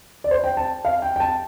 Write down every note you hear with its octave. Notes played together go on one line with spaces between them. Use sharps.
D5
C5
G5
A5
F5
G5
G5
A5